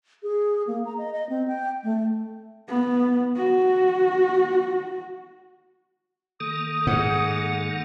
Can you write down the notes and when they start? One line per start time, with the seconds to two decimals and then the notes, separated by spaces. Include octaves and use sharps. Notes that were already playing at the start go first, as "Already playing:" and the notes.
0.23 G#4
0.67 A#3
0.85 A#5
0.98 D#5
1.13 D#5
1.29 C4
1.48 G5
1.84 A3
2.68 B3
3.37 F#4
6.40 D#3 A#3 A4 D#6
6.87 G#2 F#5